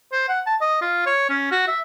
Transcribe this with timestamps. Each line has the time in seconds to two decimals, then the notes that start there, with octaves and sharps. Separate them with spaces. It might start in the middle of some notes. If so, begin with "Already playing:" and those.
0.12 C5
0.28 F#5
0.46 A5
0.61 D#5
0.81 F4
1.06 C#5
1.29 C#4
1.51 F#4
1.67 E5